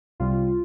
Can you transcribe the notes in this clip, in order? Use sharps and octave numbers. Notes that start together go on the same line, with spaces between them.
C2 C3 G3 F4